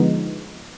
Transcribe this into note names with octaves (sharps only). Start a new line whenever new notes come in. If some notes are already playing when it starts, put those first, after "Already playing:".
Already playing: D3 F3 G#3 B3 D#4